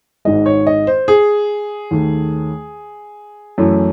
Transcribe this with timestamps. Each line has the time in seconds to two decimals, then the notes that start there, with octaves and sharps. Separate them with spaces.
0.25 G#1 G#2 D#3 G#3 D#5
0.46 C#5
0.67 D#5
0.87 C5
1.08 G#4
1.91 D#2 D#3 A3
3.58 F#2 E3 A3